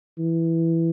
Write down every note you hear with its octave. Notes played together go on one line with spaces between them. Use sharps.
E3